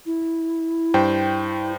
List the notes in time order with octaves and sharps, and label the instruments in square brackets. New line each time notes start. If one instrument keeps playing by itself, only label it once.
[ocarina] E4
[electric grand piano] G2 C5 G5